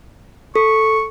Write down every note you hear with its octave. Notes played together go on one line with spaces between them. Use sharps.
A4 C#6